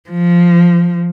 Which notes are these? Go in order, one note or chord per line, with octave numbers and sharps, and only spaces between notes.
F3